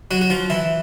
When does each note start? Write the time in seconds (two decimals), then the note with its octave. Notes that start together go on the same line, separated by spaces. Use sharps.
0.11 F#3 F#4
0.21 F#4
0.30 F3 F4
0.50 E3 E4